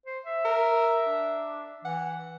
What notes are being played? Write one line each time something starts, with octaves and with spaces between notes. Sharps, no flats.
C5
E5
A#4
D4
E3 F#5